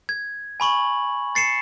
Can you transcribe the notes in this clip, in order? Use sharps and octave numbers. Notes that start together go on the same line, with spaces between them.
G#6
G#5 B5 C#6 F#7
A6 C7 C#7 E7